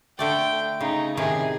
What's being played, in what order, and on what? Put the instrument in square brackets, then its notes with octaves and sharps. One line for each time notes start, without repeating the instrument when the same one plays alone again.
[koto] D3 A3 D5 [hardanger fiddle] G5
[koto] C#3 [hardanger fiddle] D#4
[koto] A2 C3 D#3 [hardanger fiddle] G#4